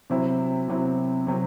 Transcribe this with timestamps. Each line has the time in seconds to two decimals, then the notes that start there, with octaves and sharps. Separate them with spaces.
0.10 C3 F#3 C4 E4
0.68 C3 F#3 C4 E4
1.27 C3 F#3 C4